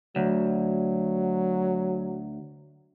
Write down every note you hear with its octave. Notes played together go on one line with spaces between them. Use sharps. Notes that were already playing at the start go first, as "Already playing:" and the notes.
D2 F#3